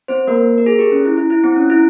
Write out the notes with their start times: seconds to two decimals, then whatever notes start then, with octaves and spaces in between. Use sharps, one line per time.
0.08 C4 C5
0.27 A#3 A#4
0.58 A#4
0.66 G#4
0.79 G4
0.92 C#4
1.05 E4
1.17 E4
1.30 E4
1.44 C4
1.56 C#4
1.70 E4